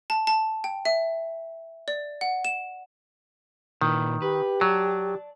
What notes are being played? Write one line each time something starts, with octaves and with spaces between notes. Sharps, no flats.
A5
A5
G5
E5
D5
F#5
E7
A#2 D#3 E4 B4
G4 B4
F#3 D5 A5